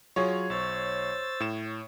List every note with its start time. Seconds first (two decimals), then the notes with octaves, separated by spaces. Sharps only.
0.16 F#3 F4 G#4 C#5
0.50 B1 C5 E6 A6
1.40 A2 E7